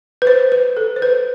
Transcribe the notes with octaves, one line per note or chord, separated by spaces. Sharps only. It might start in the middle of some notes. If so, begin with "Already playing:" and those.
B4
C5
B4
A4
C5
B4